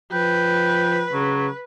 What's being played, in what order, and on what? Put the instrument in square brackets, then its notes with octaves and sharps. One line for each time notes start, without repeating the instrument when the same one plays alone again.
[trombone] F3 [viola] B4 [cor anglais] G5
[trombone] C#3 [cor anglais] F#3